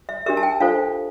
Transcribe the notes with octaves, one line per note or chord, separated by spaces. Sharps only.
E5
D4 G4 A#4 E5
A5
G5
D4 F4 A4 C5 F5